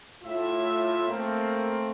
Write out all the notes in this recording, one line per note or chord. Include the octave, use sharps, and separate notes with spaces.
A2 F4 E5
A3 A#3 C4